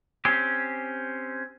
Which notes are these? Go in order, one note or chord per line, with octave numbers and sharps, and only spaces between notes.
C4 C#4 G4